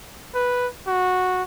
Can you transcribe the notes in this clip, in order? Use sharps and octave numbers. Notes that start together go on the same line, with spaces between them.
B4
F#4